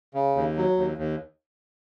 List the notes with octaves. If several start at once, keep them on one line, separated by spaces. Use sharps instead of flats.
C#3
D#2
F#3
D#2
D#2